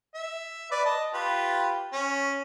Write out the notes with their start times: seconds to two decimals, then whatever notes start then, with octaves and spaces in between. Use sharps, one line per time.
0.15 E5
0.71 B4 D5
0.85 D#5 A5
1.14 F4 G4 B4
1.93 C#4